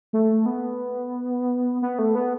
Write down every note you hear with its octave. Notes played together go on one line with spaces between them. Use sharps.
A3
B3
B3
A3
B3